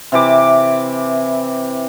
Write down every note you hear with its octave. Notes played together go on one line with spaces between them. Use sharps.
C3 E3 D6